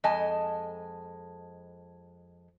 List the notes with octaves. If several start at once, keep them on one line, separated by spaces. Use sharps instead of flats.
F2 G#3 D#5 G#5 A5